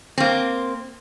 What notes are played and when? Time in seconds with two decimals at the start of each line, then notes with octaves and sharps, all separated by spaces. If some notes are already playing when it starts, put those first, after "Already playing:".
0.18 A#3 C4